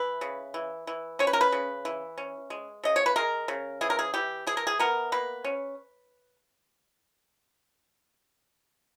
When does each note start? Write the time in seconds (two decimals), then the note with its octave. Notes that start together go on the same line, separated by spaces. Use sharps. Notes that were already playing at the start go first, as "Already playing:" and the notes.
Already playing: E3 B4
0.21 C#3
0.54 E3
0.87 E3
1.19 C#4 C#5
1.27 B4
1.33 A#4
1.41 B4
1.52 C#3
1.85 E3
2.18 C#4
2.50 G#3
2.84 C#3 D#5
2.96 C#5
3.06 B4
3.16 G#3 A#4
3.48 C#3
3.81 E3 G#4
3.90 A#4
3.99 G#4
4.14 E3 G4
4.47 E3 G#4
4.57 A#4
4.67 G#4
4.79 B3 A#4
5.12 A#3 B4
5.44 C#4